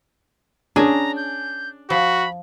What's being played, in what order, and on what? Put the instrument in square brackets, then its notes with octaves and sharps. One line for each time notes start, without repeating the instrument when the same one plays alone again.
[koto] C#4 G#4 G#5 [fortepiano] D4 [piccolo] A#5
[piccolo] G6
[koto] F3 [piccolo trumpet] F#4 [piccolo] B5